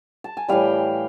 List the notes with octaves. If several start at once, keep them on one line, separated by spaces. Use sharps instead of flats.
A5
G#5
A2 E3 G3 F5 G5